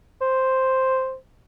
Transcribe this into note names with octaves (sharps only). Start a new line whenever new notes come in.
C5